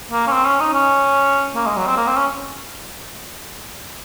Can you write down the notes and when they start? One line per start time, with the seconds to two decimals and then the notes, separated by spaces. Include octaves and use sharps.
0.11 A#3
0.27 C#4
0.32 C4
0.45 C#4
0.60 D#4
0.74 C#4
1.55 A#3
1.66 G#3
1.77 F#3
1.87 C4
1.97 A#3
2.07 C4
2.17 C#4